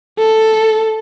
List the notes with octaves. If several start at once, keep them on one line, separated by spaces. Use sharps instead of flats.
A4